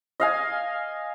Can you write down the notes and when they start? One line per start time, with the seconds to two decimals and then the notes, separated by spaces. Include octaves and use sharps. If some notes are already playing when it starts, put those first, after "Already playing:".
0.20 D#5 F5 G#5